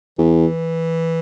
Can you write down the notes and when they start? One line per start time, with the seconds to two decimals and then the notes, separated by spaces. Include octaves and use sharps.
0.18 E2 E3